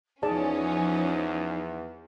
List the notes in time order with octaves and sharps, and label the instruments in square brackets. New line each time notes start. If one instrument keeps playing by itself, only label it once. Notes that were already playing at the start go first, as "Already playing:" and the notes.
[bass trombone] E2 [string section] F3 C#4 [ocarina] D#4 [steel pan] G#4 D5 A5